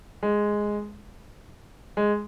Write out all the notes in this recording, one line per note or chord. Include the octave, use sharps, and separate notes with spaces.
G#3
G#3